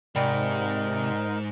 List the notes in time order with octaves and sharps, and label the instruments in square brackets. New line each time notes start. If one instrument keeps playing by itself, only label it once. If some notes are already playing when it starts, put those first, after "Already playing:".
[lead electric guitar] G#2 [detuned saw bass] C3 [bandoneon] D#4 A#4 [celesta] D5 G5 B5